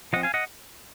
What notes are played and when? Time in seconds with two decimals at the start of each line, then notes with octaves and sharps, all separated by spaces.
0.13 F3 C4 D#5 F#5
0.23 F5 G#5
0.34 D#5 F#5